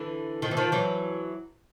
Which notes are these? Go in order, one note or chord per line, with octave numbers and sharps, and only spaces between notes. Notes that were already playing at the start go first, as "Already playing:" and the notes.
Already playing: D3 E3
D#3 F3
E3
D#3 F3
E3 F#3